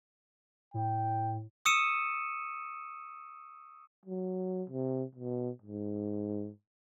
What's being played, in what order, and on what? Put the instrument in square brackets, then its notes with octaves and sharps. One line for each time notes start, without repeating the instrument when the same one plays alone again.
[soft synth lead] A2 [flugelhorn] G5
[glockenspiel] C#6 D#6 E6 C#7 D#7 E7
[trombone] F#3
C3
B2
G#2